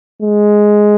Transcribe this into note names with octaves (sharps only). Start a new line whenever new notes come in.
G#3